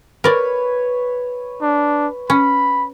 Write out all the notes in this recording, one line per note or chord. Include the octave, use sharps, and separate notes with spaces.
A#4 B4 C#5 D5
D4
C#4 B5